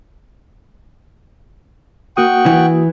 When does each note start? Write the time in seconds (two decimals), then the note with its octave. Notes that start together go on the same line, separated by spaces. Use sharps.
2.17 A#3 F#4 F#5 G5 C#6 D#6
2.46 E3